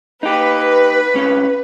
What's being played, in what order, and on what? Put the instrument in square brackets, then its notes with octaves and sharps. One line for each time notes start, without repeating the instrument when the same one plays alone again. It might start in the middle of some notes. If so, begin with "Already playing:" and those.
[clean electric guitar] D#4 G4 [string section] B4
[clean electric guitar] C2 C#4